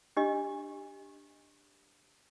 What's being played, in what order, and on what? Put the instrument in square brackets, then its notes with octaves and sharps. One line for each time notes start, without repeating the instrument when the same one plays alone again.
[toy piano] D4 G4 D#5